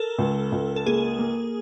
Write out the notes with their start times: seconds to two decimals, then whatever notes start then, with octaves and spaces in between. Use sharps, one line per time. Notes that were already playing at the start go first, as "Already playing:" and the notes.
Already playing: A4 A#4
0.18 C#2
0.52 C#2
0.76 A4
0.86 A#3 G#4
1.19 A#3